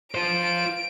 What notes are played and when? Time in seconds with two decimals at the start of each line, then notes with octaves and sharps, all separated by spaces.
0.15 F4 C5 D7